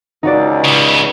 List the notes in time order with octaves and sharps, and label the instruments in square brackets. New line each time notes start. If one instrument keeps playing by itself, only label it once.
[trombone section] C#2 [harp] D#4 F#4 D5
[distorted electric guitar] C#3 B3